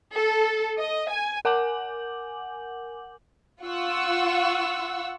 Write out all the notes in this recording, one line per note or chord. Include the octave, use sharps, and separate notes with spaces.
A4
D#5
G#5
A#4 F#5 G#5 D6 G6 F#7
F4 F#5 C#6 E6